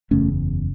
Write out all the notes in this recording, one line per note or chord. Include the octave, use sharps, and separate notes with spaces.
F#1 E2 C#3 A3 C#4